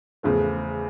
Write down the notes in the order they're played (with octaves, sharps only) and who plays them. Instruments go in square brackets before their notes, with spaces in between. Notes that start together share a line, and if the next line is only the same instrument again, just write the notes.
[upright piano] E2 C#3 F3 A3